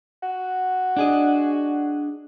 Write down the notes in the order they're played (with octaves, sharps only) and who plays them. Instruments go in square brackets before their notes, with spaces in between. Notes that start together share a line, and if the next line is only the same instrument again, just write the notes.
[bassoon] F#4
[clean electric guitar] D4 G#4 D#5